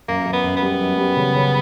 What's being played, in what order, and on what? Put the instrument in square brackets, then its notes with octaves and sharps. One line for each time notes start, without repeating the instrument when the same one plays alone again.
[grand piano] F#2 [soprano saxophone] A#3
[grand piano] F#2
[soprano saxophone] B3
[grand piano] F#2
[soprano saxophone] B3
[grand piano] G3
F#2
G3
C#3
C#3